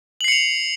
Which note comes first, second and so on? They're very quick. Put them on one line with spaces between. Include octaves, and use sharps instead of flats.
F#7 C7 C#7 F7